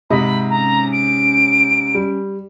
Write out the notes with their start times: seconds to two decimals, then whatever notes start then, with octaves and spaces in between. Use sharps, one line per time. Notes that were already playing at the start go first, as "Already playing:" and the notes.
0.10 G#2 C3 D#5 B5
0.50 C#4 A#5
0.92 D7
1.95 G3